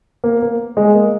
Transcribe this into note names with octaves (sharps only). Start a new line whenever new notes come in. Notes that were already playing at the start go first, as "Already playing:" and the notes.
A#3
A#3
G#3
A#3